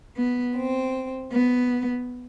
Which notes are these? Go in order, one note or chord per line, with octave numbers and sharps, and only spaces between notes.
B3
C4
B3